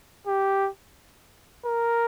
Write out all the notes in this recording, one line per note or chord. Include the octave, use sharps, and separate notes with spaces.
G4
A#4